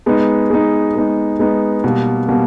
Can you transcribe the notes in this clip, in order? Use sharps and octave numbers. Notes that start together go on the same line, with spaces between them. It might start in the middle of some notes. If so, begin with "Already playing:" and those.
G#3 B3 D#4
G#3 B3 D#4
G#3 B3 D#4
G#3 B3 D#4
B2 G3 A#3
B2 G3 A#3